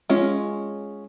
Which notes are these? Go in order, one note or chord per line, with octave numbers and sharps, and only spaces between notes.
G#3 C#4 F4